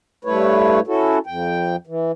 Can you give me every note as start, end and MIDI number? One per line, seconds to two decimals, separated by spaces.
0.25 0.80 43
0.25 0.80 57
0.25 0.80 64
0.25 0.80 71
0.25 0.80 73
0.87 1.19 61
0.87 1.19 64
0.87 1.19 66
0.87 1.19 69
1.27 1.76 41
1.27 1.76 79
1.87 2.12 52